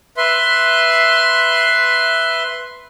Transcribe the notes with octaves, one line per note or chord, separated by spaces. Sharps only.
B4 E5 C6